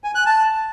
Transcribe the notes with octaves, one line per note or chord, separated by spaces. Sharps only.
G#5
F#6
A5